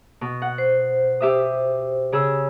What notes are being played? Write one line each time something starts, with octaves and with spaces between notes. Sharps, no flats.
B2
F#5
C5
G4 E5 D#6
C#3 G#4 E6